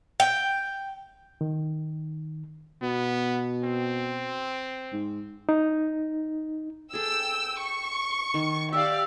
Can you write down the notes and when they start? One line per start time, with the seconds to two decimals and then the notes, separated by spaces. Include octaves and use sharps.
0.20 G5
1.41 D#3
2.82 B2 B3
3.64 C4
4.93 G#2
5.49 D#4
6.93 G#4 A4 G5 E6
7.59 C#6
8.34 D#3
8.73 G4 D5 E5 F5 E6